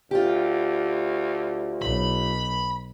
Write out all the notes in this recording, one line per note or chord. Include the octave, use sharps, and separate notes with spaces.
D2 F4 G4
B1 B5